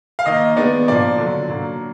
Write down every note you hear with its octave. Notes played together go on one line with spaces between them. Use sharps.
F5
D#3 A#3 D#4 D#5
D#3 G#3 B3 D4 D5
A#2 F3 A#3 D5
D3 F#3 D4
A#2 F#3 A#3